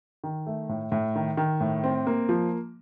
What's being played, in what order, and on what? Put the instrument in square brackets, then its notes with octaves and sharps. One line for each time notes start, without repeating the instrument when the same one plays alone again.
[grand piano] D#3
A3
A2
A2
D#3
D#3
A2
C4
A#3
F3